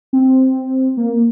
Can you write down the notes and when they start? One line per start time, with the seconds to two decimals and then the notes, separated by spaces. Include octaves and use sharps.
0.13 C4
0.97 A#3